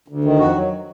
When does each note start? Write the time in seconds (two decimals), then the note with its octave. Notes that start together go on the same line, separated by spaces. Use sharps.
0.08 D2
0.25 D#3
0.39 F2 F#4
0.55 F#3